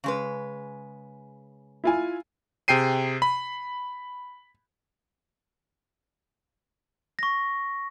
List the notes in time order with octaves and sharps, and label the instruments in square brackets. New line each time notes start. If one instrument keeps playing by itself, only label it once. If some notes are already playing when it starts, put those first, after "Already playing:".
[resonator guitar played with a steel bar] C#3 G#3 B4
[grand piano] E4 F4 G#5
[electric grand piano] C3 G#4 G5 C7 D#7
B5
[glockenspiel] C#6 A#6